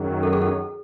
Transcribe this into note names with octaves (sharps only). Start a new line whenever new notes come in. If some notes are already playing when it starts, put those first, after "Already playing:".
Already playing: F#2 D#3 F#3 G#4
A4
G#4
A4